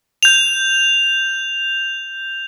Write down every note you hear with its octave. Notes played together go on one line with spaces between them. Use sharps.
G6 F7